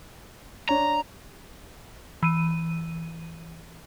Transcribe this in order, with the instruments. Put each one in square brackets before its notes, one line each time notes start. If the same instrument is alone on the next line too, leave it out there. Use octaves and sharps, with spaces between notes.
[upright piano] D4 C#5 [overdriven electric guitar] A#5
[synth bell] E3 D#7